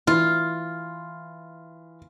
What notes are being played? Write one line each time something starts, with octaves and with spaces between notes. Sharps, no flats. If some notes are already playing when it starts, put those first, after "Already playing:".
E3 F4